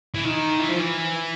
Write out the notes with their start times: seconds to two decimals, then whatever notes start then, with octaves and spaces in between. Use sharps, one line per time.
0.14 E3
0.25 D#3
0.59 E3
0.69 F3
0.79 E3